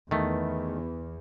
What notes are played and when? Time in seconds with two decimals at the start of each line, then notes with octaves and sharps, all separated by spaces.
0.11 E2 D#3 A3